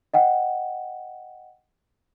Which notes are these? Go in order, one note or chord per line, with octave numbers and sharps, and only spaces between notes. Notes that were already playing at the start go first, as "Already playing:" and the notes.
D#5 F#5 G5